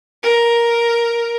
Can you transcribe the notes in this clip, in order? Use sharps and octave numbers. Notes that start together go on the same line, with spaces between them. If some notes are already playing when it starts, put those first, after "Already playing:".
A#4